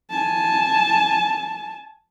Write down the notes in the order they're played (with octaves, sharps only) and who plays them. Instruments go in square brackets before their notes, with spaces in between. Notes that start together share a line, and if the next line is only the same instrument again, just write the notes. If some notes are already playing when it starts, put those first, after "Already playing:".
[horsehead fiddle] G#5 A5